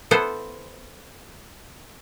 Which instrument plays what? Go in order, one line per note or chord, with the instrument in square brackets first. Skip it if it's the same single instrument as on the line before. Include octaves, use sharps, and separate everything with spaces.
[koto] B3 E4 A4 C5